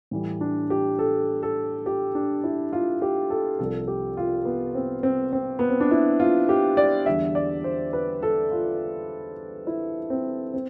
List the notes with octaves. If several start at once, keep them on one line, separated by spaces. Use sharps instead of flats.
A2 E3 G3
D4
G4
A4
A4
G4
D4
E4
F4
G4
A4
C2 C3 F3 A4
G4
F4
B3
C4
C4
C4
B3
C4
D4
E4
F4
G4
D5
E2 D3 G3 E5
D5
C5
B4
A4
F4
E4
C4
C4